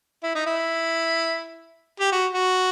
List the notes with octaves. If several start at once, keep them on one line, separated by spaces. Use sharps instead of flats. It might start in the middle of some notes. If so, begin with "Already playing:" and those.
E4
D#4
E4
G4
F#4
F#4